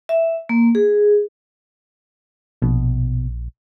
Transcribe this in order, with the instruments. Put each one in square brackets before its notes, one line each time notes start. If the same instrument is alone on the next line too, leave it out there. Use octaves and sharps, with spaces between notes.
[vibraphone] E5
A#3
G#4
[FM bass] A#1 [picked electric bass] B2